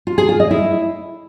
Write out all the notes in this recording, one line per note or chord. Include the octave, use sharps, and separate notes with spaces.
F4
G#4
F4
D#5
E4